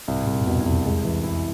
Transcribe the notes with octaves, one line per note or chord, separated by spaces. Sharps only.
C2 G#2
A2
C2 A#2
F2
E2 B2
F2
C2
E2
G#3
E3
F2 E4